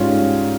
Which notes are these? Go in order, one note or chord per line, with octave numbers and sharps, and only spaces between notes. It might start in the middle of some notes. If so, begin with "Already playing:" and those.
Already playing: G#2 G3 C#4 F4